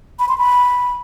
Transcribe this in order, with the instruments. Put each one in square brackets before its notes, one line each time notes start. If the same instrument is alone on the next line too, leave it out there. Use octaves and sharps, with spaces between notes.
[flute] B5
C6
B5